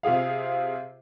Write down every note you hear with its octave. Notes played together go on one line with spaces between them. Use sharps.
C3 F4 G#4 F5